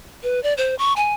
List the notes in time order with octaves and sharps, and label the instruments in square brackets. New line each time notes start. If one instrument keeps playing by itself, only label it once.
[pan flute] B4
D5
C5
C#6
G#5